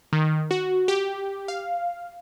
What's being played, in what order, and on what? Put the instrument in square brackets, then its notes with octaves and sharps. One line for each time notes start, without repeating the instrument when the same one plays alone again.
[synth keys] D#3
F#4
G4
F5